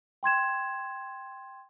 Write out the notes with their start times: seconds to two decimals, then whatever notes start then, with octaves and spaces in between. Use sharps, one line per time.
0.23 G5 C6 G#6 E7